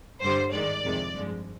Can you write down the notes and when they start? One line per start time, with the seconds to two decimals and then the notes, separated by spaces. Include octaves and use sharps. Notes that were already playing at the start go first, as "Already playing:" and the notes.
0.21 G2 D3 G3 C5
0.52 G#2 D#3 G#3 D5
0.83 F2 C3 D#3 G#3
1.13 G2 F3 G#3